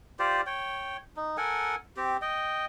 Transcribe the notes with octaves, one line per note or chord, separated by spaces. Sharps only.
F4 G4 C5 D5
C#5 G5
D#4
A4 A#4 F#5 G#5
C4 G4
D#5 G5